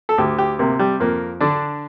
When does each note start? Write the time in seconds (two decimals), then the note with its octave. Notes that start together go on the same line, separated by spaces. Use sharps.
0.09 A4
0.18 D2 G4
0.38 G4
0.59 C3 A#3
0.79 G3
1.00 F2 A#3
1.40 D3 D4